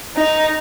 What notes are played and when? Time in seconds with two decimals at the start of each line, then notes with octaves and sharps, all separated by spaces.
0.15 D#4